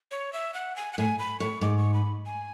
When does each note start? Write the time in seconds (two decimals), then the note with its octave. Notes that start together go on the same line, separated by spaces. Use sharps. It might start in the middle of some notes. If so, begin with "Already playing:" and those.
0.11 C#5
0.33 E5
0.54 F#5
0.76 G#5
0.93 F#5
0.98 A2 G#5
1.19 B5
1.40 A2 C#6
1.61 G#2 D6
1.78 C#6
1.94 B5
2.26 G#5